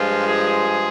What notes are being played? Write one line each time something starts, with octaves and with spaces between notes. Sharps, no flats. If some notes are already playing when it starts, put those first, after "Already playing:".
Already playing: G2 F3 G#3 F4
G#4